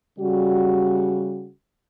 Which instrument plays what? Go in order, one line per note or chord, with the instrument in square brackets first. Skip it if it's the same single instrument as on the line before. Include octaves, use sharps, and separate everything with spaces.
[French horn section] C#3 G3 F#4